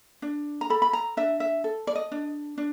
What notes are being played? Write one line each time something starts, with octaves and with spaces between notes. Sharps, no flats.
D4
A#5
A4 B5
B5
A#5
D4 E5
E5
A4
D5
D#5
D4
D4